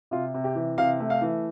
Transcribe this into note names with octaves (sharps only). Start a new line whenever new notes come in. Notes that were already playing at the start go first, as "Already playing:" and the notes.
C3 F4
C3
G4
E3
C3 F5
A3
F5
E3